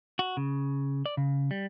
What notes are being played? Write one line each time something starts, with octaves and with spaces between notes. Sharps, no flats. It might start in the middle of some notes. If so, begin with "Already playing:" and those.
F#4
C#3
D5
C#3
G3